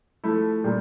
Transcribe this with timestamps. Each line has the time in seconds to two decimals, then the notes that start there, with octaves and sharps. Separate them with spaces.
0.24 F3 A3 E4 A4
0.64 A#2 G3 D4